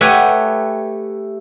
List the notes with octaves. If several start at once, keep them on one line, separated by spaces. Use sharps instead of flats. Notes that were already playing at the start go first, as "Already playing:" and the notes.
A3 G4 B4 C#5 F#5 G#5